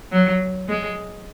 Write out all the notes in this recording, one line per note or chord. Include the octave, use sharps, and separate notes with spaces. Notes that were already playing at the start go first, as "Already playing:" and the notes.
F#3
G#3